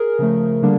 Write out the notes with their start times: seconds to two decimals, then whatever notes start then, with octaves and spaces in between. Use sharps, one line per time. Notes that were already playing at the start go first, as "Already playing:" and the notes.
Already playing: G#4 A#4
0.19 C#3 F3 A3
0.62 D3 G3 A#3 D4